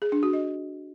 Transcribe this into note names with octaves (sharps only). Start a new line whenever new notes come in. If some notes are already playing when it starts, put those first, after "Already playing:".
G#4
D4
F#4
D#5